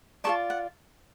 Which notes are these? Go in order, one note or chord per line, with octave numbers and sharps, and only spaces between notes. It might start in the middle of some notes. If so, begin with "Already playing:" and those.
F4 A4 D5 A5 C#6
F#5